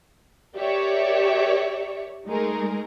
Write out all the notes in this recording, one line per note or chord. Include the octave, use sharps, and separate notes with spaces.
G4 A#4 C#5 D5 E5
G#3 A3 D#4 G#4 A#4